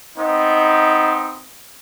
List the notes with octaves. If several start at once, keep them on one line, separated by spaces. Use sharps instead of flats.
B3 C4 D#4